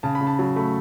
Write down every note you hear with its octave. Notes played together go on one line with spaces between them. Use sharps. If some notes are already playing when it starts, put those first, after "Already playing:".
C#3 A5
B5
C#3
A5
F#3 A5
A3 B5